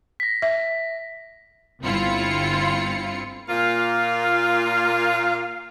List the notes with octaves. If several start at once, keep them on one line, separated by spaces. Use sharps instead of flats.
A#6 B6
E5
G1 C4 E4 F4 C#7
A#2 A#3 F4 F5